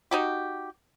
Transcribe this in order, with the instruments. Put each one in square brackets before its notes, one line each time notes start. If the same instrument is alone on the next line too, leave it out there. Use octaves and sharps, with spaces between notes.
[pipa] D#4 F#4 G4